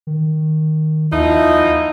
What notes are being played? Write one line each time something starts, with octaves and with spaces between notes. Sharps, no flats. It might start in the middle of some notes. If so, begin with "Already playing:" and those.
D#3
D#2 F3 D#4 E4